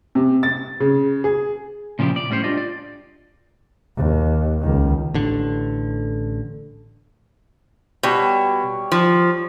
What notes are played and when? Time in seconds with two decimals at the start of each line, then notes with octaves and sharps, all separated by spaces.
0.15 C3
0.43 A6
0.80 C#3
1.24 G#4
1.99 A#2 C#3 F3 E4 G4
2.16 D5
2.30 A2 G3 C#4 D4 C5 C#5
2.44 D4 F4 G4 D5 D#5
2.57 D5
3.97 D#2
4.60 C#2 D#3
5.14 A1 D3
8.03 B2 G3 C#5
8.92 F3